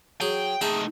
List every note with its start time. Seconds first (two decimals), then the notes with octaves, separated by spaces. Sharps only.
0.21 F#3 G#4 G5
0.61 A3 D#4 G#4 E5 G5